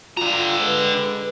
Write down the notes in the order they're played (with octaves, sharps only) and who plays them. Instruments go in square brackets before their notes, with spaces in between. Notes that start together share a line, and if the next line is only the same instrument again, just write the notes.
[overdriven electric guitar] D3 A#5 [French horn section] F4
[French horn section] G#3 B4